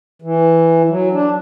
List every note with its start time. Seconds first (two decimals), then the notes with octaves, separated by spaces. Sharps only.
0.22 E3
0.89 F#3
1.12 D4